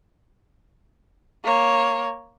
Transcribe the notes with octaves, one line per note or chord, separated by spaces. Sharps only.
A#3 C#5